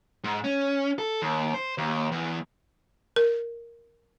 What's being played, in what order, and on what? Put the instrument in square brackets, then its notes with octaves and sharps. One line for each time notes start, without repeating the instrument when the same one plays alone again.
[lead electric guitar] G#2
C#4
A4
D#2
C5
D#2
E2
[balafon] A#4